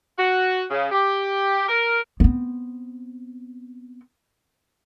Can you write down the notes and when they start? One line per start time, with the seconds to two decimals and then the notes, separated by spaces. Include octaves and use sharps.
0.17 F#4
0.70 C#3
0.90 G4
1.67 A#4
2.20 B3 C4